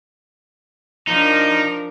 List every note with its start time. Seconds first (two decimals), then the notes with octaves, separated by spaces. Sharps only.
1.07 F3 D4 D#4 A#4